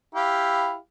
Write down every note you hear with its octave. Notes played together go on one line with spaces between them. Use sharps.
E4 G4 F5